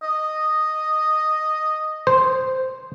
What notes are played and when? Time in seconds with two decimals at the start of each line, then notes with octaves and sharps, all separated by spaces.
0.03 D#5
2.07 C5